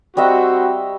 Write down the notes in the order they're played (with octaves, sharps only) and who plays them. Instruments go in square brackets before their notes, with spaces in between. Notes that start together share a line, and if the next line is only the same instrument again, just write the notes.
[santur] G3 D#5 E5 [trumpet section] C4 F#4